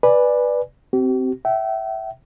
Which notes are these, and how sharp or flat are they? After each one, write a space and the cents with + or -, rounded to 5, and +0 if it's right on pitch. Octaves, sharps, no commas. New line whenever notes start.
B4 -5 D5 +10 G#5 +0
C4 -10 G4 -45
E5 +0 G5 -35